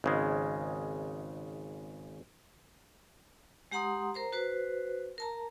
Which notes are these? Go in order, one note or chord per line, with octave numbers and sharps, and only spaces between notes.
G#1 C#3 G#3
G#3 G4 F#5 A#5 C6 D#6
A#4 C5 A#5
F#4 B4 C5
A#4 A5 A#5